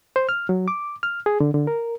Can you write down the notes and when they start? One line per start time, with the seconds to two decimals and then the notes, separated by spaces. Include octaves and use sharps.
0.16 C5
0.29 F6
0.49 F#3
0.68 D6
1.03 F6
1.26 G#4
1.40 D3
1.54 D3
1.67 A#4